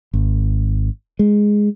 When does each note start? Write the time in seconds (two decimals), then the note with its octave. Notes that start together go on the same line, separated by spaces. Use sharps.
0.13 G#1
1.19 G#3